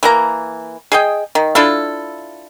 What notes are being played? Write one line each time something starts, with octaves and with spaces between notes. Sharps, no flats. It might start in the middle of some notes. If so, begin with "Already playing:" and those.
E3 A#3 A#5
G#4 D#5 G5
D#3
D4 E4 F4 A4